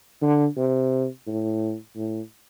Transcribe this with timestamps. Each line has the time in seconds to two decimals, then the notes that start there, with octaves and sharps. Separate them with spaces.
0.22 D3
0.57 C3
1.27 A2
1.96 A2